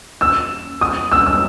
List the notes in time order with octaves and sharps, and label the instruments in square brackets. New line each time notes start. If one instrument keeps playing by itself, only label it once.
[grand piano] E6
D#6
E6
E6